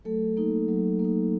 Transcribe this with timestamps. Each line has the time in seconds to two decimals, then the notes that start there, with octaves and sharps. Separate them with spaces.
0.05 F#3 A3 A4
0.37 A#3 D#4
0.68 F#3
0.99 A#3
1.04 D#4